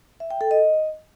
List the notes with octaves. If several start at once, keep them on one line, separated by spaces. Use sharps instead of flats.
E5
G5
A4
D#5